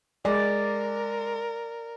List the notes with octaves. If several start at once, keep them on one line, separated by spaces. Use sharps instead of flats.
G#3 A#4 D5